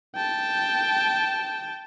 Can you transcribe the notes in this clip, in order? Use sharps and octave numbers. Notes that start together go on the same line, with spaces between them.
G5 A5